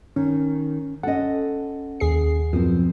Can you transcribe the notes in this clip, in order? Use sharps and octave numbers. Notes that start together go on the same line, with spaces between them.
D#3 C#4
C#4 A4 D#5 F#5
D#2 G#4 C7
F#2 B2 F3 C4